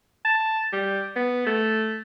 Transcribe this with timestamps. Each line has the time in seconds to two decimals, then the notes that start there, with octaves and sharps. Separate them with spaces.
0.25 A5
0.72 G3
1.16 B3
1.46 A3